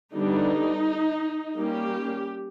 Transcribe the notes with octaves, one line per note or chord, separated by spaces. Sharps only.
D3 G3 B3 D4 D#4
G3 A#3 C#4 G4